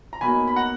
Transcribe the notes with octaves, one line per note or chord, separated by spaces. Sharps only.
A#5
B2 F#3 A#3 D#4 G#5 B5
B5
F#5 A#5